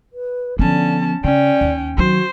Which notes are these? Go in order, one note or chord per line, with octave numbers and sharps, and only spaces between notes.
B4
D3 F3 B3 C#4 A5
C#3 C#4 D5 G5
D#2
D#3 F#3 F#4 C5